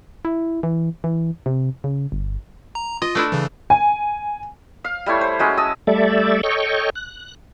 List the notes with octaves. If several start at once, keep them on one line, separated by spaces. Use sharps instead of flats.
E4
E3
E3
C3
C#3
G1
A#5
F4 D#5
A3 D4 E4
C#3 E3
G#5
F5
G3 A3 E4 C#5
C5
F#3 G#3 C#4
D#5 A5 E6
G3 A3 A4 D5 E5
A4 C#5 D#5 G5 C#6
F#6